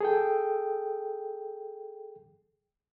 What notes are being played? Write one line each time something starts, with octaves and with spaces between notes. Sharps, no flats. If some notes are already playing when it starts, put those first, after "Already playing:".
G#4 A4 G5